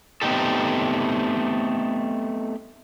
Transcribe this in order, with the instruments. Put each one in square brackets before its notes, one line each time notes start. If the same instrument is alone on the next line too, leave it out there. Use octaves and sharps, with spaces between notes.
[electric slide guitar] A3 B3 C4 D#4 G4 A4